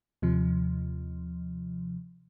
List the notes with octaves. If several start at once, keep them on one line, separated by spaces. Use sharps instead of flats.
D#2 C3 F3